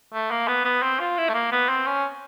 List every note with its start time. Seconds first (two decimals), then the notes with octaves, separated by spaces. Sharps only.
0.13 A3
0.31 A#3
0.48 B3
0.65 B3
0.83 C4
1.00 F4
1.18 E4
1.29 A3
1.34 A#3
1.52 B3
1.69 C4
1.87 C#4